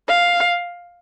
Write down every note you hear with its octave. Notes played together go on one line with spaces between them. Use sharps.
F5